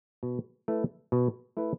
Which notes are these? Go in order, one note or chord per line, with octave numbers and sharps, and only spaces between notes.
B2
A3 E4 B4
B2
A3 E4 B4